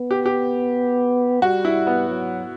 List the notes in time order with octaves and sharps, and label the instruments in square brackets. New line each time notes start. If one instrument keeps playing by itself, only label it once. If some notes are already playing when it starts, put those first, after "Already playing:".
Already playing: [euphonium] B3
[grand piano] G4
G4
[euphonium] G3 [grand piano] F#4
[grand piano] E4
B3
[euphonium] F#3